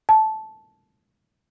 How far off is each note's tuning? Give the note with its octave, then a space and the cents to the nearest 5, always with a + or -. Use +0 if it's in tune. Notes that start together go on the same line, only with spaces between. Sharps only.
A5 -10